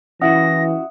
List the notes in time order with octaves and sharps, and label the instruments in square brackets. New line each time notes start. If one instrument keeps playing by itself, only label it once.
[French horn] E3 [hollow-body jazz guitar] C#4 E4 F#4 [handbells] E5 F#5 D#6 [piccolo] A#6